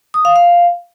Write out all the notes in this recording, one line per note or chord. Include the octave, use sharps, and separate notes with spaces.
D#6
F5
F5